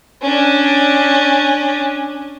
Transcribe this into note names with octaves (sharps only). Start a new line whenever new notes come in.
C#4 D4